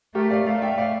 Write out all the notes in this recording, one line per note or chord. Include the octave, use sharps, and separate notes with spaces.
A3 G4 A#4
D5 F5
A3 D5 F5
E5 G5
D5 F5